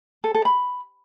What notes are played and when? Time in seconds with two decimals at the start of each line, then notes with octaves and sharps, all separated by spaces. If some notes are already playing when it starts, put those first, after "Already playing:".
0.24 A4
0.34 A4
0.45 B5